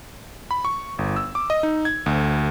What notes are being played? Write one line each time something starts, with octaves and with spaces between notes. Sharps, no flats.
B5
C#6
G1
E6
D6
D#5
D#4
G#6
D2